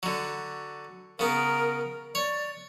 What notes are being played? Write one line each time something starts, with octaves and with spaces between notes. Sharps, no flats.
D3 F#3
C#3 B3 A#4
C#5 D5